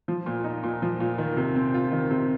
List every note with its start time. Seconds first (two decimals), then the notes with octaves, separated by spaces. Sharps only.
0.08 F3
0.26 A#2
0.44 D#4
0.63 A#2
0.82 F3
1.00 A#2
1.18 D#3
1.37 C3
1.56 C4
1.74 F4
1.92 D#3
2.11 C3